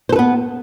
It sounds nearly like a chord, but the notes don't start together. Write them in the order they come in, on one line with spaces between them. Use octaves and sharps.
C5 A4 B4 B3